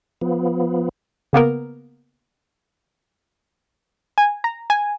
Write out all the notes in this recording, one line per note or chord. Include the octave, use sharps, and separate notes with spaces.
F3 B3
C#3 A#3 B3 A#4
G#5
A#5
G#5